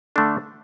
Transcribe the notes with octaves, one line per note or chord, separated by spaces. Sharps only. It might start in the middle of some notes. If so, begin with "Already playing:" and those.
D3 A3 D4 A4